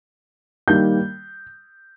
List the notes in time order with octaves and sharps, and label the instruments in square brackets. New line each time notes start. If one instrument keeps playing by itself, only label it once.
[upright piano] D#3 G3 A#3 G6